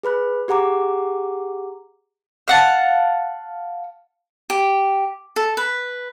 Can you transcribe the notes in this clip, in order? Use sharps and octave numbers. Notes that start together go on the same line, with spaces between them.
G#4 B4 B5 F#6
G4 G#4 F#5 A#5 D6
F5 F#5 A5
G4
A4
B4